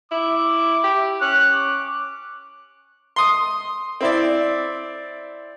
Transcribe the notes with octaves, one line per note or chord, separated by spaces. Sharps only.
E4 D6
G4
C#4 F#6
D6
C6 D#6
C4 E4 D5